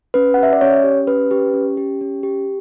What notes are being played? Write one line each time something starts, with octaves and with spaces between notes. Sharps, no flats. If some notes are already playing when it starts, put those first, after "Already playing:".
C#4 B4
G4 F#5
E5
D5
C#4 C#5
G4
C#4 B4
G4
C#4
G4
C#4
G4